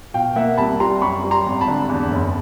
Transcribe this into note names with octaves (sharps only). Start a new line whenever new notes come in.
B2 F5 G5
A#3 E5 F#5
C2 A5 B5
G3 A#5 C6
F#2 B5 C#6
G3
A#5 C6
G#1
A5 B5
D3
E2
F#1